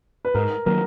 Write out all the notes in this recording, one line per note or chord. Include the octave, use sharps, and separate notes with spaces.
B4
G#2 A#4
D#3 F#3 A#3 A#4